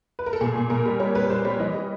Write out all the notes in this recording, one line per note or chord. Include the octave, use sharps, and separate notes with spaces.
B4
A#4
A4
A#2 G#4
A#2
A#2 A#4
G3
G3 C#5
G3 B4
G3 C5
G3 C#5
E3 D#5
G3